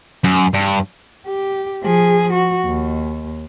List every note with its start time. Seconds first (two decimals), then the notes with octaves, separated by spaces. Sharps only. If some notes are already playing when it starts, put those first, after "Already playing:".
0.24 F#2
0.54 G2
1.27 G4
1.83 F3 G#4
2.33 F#4
2.66 D#2